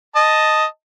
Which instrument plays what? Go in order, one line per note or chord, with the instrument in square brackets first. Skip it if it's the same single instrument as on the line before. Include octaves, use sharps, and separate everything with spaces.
[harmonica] D#5 A5